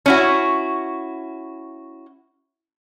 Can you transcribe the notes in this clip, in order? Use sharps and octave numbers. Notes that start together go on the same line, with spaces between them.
C#4 E4 F#4